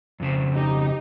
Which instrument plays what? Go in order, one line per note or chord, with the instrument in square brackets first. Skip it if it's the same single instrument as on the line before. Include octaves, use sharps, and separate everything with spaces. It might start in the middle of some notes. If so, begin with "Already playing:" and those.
[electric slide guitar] F2 C#3 C5
[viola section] D#4 G4